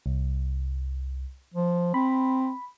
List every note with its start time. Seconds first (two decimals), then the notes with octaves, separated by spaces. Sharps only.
0.06 C2
1.54 F3
1.94 C4 B5